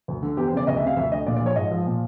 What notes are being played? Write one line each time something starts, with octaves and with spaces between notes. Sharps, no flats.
D2
D3
E2 G4
C5
C#3 D5
D2 D#5
E5
C3 F5
D2 E5
D3 D#5
A#2 D5
D5
F3 C#5
G#2 D#5
F3
A#2